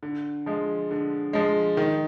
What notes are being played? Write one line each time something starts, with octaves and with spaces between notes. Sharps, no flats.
D3
F3 G#3
D3
F3 G#3
D#3